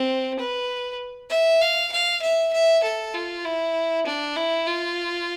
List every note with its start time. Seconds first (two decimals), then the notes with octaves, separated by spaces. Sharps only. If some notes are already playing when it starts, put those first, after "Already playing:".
Already playing: C4
0.39 B4
1.30 E5
1.61 F5
1.92 F5
2.22 E5
2.52 E5
2.84 A4
3.14 F4
3.44 E4
4.06 D4
4.36 E4
4.67 F4